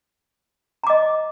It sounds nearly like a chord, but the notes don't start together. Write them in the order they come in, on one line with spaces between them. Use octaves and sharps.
A#5 D6 D#5